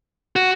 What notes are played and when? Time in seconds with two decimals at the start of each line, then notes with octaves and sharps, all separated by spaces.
0.36 F#4